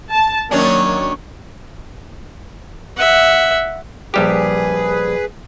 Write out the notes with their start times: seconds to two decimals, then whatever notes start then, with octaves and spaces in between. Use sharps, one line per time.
0.11 A5
0.51 D#3 F#3 A#3 C#4 D4
2.97 E5 F#5
4.14 A#1 G3 G4 G#4 B4